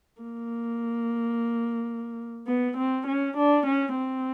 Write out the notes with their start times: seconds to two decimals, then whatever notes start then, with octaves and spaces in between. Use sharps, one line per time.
0.22 A#3
2.47 B3
2.77 C4
3.07 C#4
3.37 D4
3.67 C#4
3.97 C4